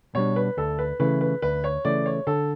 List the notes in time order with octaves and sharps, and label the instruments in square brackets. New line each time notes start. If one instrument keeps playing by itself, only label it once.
[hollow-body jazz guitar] B2 G3 D4 [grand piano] C#5
[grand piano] B4
[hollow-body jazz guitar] D2 [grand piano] A4
[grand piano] B4
[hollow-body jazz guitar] C#3 E3 A3 [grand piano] B4
[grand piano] B4
[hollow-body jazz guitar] D2 [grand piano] B4
[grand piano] C#5
[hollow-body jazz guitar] C#3 E3 A3 [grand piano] D5
[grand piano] C#5
[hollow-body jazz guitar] D3 [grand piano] A4